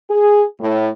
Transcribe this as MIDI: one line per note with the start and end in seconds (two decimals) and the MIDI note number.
0.10 0.43 68
0.60 0.89 45